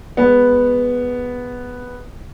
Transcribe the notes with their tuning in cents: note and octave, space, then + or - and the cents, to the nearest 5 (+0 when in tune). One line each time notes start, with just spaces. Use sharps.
G#3 -10 B3 +0